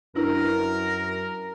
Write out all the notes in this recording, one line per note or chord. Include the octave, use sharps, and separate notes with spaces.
F#2 D4 E4 A#4 B4